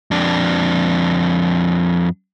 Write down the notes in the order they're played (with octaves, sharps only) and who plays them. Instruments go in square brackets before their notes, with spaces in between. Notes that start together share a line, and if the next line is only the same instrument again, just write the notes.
[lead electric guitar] F2 D4